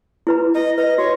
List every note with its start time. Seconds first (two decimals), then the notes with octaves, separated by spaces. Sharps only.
0.27 E4 B4 A#5
0.54 D#5
0.78 B4 D#5
0.98 F#4 C#5